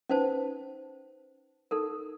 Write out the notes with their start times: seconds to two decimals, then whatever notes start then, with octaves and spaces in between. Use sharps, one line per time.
0.10 C#4 D#4 B4 C5 A5
1.71 D#4 A4 A#4